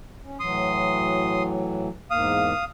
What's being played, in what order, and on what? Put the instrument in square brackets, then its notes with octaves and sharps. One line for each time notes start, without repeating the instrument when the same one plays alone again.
[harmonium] C#4
[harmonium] A2 E3 F#3 [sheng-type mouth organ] C6 D#6
[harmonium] E2 G#2 A#3 [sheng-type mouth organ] F5 D#6